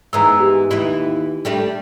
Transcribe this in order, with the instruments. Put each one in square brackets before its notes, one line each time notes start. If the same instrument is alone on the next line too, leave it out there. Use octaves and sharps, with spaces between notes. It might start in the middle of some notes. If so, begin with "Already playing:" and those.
[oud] G#2 E3 B3 [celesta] A#5 E6
[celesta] G4
[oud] D#2 E3 E4
G3 A3 D4